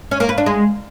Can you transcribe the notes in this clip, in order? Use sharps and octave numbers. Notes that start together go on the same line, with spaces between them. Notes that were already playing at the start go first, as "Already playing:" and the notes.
C#4
A#3
B4
D4
G#3